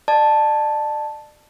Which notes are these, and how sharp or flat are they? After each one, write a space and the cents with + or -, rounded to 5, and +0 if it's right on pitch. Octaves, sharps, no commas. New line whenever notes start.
D5 +40 A5 +0